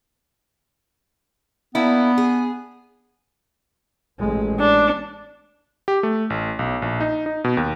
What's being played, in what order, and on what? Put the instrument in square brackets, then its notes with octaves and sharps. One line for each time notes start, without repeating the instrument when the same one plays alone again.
[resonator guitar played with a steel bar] A#3 D4 E4 [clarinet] B3
[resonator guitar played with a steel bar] G#4
[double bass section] A1 G#3
[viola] D4
[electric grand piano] G4
A3
A1
B1
A#1
D#4
D#4
B2
D#2